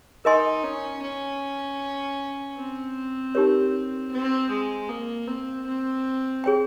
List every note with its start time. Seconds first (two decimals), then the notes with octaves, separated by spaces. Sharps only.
0.25 D#4 A#4 D#5 G#5 C6
0.63 C#4
1.03 C#4
2.57 C4
3.35 D#4 G4 A#4 C#5
4.11 C4
4.50 G#3
4.89 A#3
5.28 C4
5.66 C4
6.44 G#4 C#5 G5